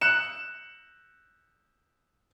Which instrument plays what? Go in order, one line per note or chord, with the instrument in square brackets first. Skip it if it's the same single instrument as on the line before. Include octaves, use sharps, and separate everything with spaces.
[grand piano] F#6 C#7 E7